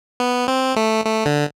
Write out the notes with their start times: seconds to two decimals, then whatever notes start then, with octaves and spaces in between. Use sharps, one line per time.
0.20 B3
0.48 C4
0.76 A3
1.05 A3
1.26 D3